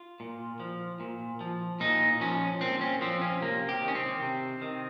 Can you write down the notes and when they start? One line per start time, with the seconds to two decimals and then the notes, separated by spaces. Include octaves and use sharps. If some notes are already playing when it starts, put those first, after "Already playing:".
Already playing: F4
0.20 A#2
0.60 F3
1.00 A#2
1.41 F3
1.80 A#2 D#4
2.20 F3 C#4
2.61 A#2 C4
2.81 C#4
3.01 F3 C4
3.22 C#4
3.41 C3 A#3
3.69 G4
3.82 D#3
3.88 C#4
3.95 C4
4.22 C3
4.62 D#3